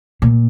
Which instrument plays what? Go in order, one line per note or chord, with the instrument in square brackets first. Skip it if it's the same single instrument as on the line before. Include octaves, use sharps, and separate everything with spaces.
[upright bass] A#2